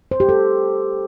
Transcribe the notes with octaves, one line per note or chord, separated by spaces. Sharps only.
C5
G4
A4